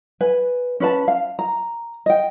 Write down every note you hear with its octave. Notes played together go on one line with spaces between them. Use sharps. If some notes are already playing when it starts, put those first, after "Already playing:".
B4 G#5
C#4 B4 A5
F5
A#5
D#5 G5